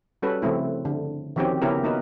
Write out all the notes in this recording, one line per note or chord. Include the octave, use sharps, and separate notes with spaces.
G3 C#4 F#4 A4 B4
C#3 F3 A3 C4 E4
D3
D#3 F3 C4 C#4 F#4 G4
C#3 B3 C#4 E4 G4 A#4
A#3 B3 D#4 F#4 A#4 B4